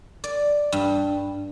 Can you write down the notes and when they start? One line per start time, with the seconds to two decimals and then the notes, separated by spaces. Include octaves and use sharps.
0.24 D5
0.72 G2